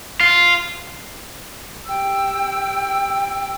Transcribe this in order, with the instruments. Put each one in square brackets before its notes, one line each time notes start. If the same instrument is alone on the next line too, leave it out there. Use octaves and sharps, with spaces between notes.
[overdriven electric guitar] F4
[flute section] G4 G5 E6